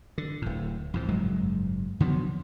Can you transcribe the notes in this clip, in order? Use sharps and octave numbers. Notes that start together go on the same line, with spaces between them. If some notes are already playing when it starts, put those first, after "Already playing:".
D3
D1 A2
F2 A2 F3
F#1 G#2 F#3 G#3
D3 F3 F#3 B3